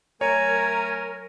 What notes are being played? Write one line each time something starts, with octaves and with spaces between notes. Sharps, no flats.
F#3 A3 A#4 C#5 G#5 A#5